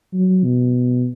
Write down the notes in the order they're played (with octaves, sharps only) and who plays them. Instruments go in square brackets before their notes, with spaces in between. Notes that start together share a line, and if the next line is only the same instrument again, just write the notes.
[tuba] F#3
B2